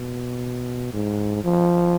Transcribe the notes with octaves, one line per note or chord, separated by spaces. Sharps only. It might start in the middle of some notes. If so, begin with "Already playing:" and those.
Already playing: B2
G#2
F3